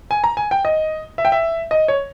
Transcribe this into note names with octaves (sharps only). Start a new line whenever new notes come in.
G#5
A#5
G#5
G5
D#5
E5
G5
E5
D#5
C#5